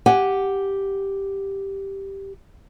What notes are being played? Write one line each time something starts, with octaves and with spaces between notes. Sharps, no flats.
G4 F#5 G#5